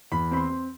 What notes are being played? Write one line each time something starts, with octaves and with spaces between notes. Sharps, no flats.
E2 B5
C4 B5
C6
C4